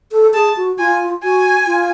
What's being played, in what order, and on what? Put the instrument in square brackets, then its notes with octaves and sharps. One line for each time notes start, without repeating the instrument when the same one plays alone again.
[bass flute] A4
[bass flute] G#4 [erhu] A5
[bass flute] F#4
[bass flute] F4 [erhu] G#5
[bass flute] F#4 [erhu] G#5
[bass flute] F4